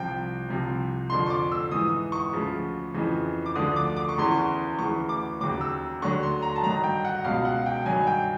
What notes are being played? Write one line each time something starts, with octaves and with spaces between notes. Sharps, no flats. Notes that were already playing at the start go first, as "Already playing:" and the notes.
Already playing: C2 C3 F3 G5
C2 C3 F3
F2 D3 F3 C6
C#6
D6
E6
G#2 E3 D#6
C#6
D2 C#3 F3
F2 C#3 E3
D6
D2 D3 F3 D#6
D6
D6
C#6
E2 C#3 E3 C6
C#6
D2 C#3 E3 C#6
D6
D#2 C#3 F#3 D6
E6
D2 D3 F#3 C#6
C6
A#5
A5
G2 D#3 F#3 A#5
G5
F#5
C#2 B2 F#3 F5
F#5
G5
G2 D#3 F#3 G#5
G5